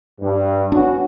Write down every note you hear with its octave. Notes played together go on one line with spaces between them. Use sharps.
G2
B3 C#4 D4 F#4